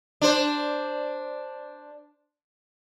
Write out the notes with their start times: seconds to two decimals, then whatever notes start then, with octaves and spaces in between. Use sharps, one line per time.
0.22 D4 C5